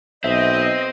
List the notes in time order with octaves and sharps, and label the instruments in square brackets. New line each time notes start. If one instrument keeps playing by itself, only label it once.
[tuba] B1 [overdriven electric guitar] C4 [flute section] D#5 [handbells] E5